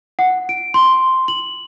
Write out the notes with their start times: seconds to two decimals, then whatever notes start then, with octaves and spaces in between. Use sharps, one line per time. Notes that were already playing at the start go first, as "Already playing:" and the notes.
0.19 F#5
0.49 D7
0.74 C6
1.28 F#7